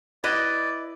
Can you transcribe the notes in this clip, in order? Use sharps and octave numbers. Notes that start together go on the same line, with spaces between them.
E4 B4 D5 D#5